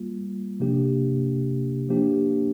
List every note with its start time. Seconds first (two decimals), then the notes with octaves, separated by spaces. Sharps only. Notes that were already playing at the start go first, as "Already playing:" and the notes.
Already playing: G3 A#3 F4
0.60 C3 F3 A#3 D4 G4
1.89 F3 A#3 D4 G4